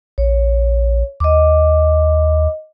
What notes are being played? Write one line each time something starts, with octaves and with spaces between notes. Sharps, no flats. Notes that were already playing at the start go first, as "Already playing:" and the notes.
A#1 C#5
D#2 D#5 D6